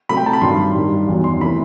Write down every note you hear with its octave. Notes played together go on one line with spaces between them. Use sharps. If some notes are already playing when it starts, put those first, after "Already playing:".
C3 F#3 A3 B5
G5
A5
B5
G2 D#3 F#3 C6
G2 D#3 G3
E2 D#3 F#3
C6
C3 E3 A3 B5